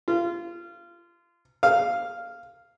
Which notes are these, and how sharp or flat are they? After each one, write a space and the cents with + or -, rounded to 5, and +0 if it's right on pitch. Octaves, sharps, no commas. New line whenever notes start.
F4 -25
F5 -5